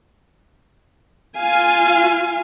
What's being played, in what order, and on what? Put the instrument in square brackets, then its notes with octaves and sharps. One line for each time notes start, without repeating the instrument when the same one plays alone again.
[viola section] F4 F5 G#5